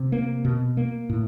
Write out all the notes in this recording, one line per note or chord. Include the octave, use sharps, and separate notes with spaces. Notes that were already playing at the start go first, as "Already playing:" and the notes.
Already playing: C3
A#3
B2
A#3
A2